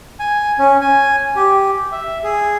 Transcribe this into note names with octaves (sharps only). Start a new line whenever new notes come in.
G#5
C#4
G#5
G4
E5
G#4